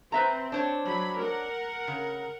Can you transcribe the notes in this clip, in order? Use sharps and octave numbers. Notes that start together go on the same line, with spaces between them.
C4 B4 E5 A#5
D4 C5 C#5
F#3 B5
A#4 F#5
C#3